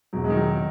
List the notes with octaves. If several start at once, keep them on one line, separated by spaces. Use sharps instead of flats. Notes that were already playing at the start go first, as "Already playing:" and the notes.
E1 F#3
G#3
D#3
F#3